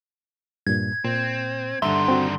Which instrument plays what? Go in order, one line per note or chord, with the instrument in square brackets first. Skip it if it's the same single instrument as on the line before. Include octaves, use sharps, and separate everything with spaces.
[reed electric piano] G2 A#2 [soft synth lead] G#6
[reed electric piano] A#2 [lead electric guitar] C4
[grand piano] G2 D3 [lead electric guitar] D#3 D4 [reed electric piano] E5 [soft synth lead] C6
[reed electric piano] C4 F#4